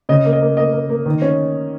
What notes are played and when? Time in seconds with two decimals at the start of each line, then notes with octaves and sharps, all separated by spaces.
0.09 C#3 D#5
0.25 A#3
0.33 D#5
0.41 A#3
0.57 A#3 D#5
0.73 A#3
0.90 A#3
1.06 D#3
1.22 C#4